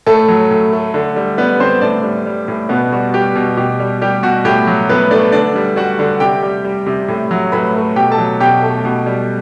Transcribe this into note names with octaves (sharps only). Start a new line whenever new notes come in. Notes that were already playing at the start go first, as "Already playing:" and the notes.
A2 A3 A4
F#3
A2
A3
D3
G3
G3 B3 B4
D3 C4 C5
A2 D4 D5
G3
G3
A2
B2 B3 B4
G3 F#4
G3 G4
B2
B2 G4
G3
G3 G4
B2 F#4
A2 G4
F#3
A2 B3 B4
A3 D4 D5
D3 D4 D5
G3
G3 F#4 F#5
D3
C3 G4 G5
G3
G3
C3
A2
F#3
A2 B4 B5
A3
B2 G4 G5
A4 A5
F#3
B2 G4 G5
A3
B2
G3